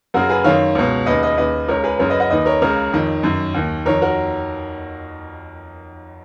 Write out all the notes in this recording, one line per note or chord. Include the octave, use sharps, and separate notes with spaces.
F#2 C#3 F#4 A#4
G#4 B4
F#2 D#3 C#5 F5
C#2 B2
D#2 C#3 B4 D#5
B4 D#5
D#2 C#3 B4 D#5
C#2 C#3 A#4 C#5
G#4 B4
F#2 C#3 A#4 C#5
B4 D#5
D#5 F#5
D#2 D#3 B4 D#5
A#4 C#5
C#2 C#3 A#4 C#5
F2 D#3
F#2 D#3
D#2 D#3
F2 D#3 A#4 C#5
F#4 A#4